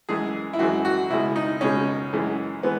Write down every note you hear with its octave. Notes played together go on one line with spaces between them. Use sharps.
F#2 E3 G#3 G#4
E4
F#2 E3 G#3 F#4
F#4
C#2 B2 G#3 E4
D#4
C#2 B2 G#3 C#4
F#2 E3 G#3
E3 G#3 B3